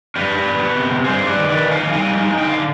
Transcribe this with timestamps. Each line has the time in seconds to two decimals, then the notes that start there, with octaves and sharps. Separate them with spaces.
0.16 D4 G4 B4
0.31 D4
0.46 B3
0.61 B3
0.75 C3
0.90 C3
1.04 G2 G#4 C5
1.19 G3
1.27 B4 D5
1.34 D#3
1.49 D#3 B4 D5
1.64 D#3
1.71 F5 G#5
1.79 D#3
1.93 G3 F5 G#5
2.08 D#4
2.23 D#4
2.38 D3 G5
2.49 D3 F5